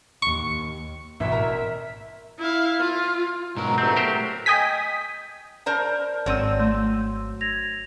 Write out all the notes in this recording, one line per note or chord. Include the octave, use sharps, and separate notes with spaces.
D#2 C#6
A1 B2 E5
A#4 A#5
E4 F5
F4
G#2 B2 F#3 A#4 A#5
G1 A3 C4
G4 A#4 C5
D#5 G5 G#5 D#6 B6
A#4 C5 D5 A5 A#5
G#1 F#3 C4 C#5 D5 E6 D#7
A3 C6
G#6 A#6 F7